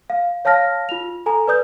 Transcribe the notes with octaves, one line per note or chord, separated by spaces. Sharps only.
F5
C#5 F5 A5 F6 A#6
F4 F7
A4 G#5 A#5
B4 D5 D#6 G6